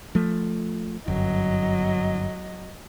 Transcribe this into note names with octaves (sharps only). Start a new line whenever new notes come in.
F3 A3
G1 F#2 F#3 D#5